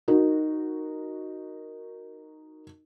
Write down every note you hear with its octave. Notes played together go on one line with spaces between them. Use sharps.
D#4 F#4 A#4